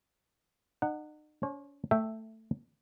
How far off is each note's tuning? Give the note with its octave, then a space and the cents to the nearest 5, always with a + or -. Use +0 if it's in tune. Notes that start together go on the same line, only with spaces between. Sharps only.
D#4 -40 F#5 +0
C#4 +40 C#5 -45
A3 +10 E5 +0 G5 +0